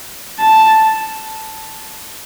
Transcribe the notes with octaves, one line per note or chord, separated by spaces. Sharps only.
A5